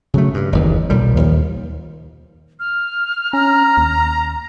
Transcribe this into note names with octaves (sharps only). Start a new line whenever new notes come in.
C#3 F#3 A3
G2
F#1 D#2 E3
B1 A#2 G3
D#2 F3
F6
C#4 A#5
D#2